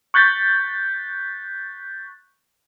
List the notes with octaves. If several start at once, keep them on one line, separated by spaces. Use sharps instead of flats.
C#6 F#6 G6 A6 B6